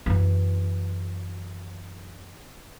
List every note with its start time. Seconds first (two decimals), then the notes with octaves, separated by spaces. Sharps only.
0.06 F#2 E3